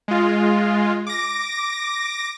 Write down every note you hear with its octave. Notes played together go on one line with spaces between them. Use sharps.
G#3 F4
D6 A#6